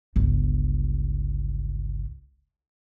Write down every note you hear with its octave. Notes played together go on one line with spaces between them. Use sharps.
G1 C#2